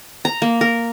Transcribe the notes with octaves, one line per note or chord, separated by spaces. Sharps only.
A#5
A#3
A#4